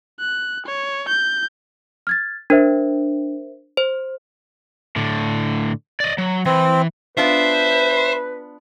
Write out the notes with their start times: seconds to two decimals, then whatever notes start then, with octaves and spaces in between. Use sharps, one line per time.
0.20 F#6
0.66 C#5
1.08 G6
2.07 F6 G#6 A6
2.50 D4 A#4 C5 E5
3.77 C5
4.96 A2 D3
6.00 D5 D#5
6.18 F#3
6.46 E3 C4
7.17 B3 D4 F4 B4 C5 E5